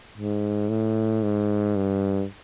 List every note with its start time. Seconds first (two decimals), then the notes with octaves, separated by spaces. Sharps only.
0.18 G#2
0.69 A2
1.23 G#2
1.76 G2